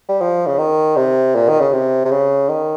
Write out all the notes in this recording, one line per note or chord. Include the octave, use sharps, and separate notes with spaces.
G3
F3
C#3
D#3
C3
A#2
D#3
C#3
C3
C3
C#3
D#3